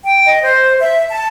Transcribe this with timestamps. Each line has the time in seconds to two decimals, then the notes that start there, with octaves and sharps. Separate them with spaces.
0.05 G5
0.25 D#5
0.43 C5
0.79 E5
1.10 A5